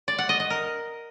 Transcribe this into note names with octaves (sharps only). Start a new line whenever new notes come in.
D5
F#5
D#5
D#5
A#4